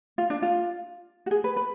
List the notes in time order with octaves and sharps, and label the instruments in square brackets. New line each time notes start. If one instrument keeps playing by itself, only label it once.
[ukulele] F4
D4
F4
F#4
G#4
B4
B4